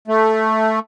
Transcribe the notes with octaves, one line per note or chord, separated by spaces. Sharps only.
A3